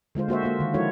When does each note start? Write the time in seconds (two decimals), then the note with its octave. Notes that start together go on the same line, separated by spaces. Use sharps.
0.15 D3 G#3 F4 C5
0.28 A#3 F#4 C5 E5
0.43 A#3 F4
0.58 D3 D#3
0.74 F3 G#3 E4 F#4 A4 C#5